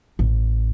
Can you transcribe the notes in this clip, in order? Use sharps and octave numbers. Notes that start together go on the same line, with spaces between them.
A1